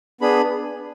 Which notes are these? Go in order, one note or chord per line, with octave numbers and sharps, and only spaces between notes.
B3 D4 G#4 B5